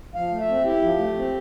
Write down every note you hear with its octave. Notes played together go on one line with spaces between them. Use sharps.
F3 F5
A3
E5
C4
E4 G4
F3
A3
C4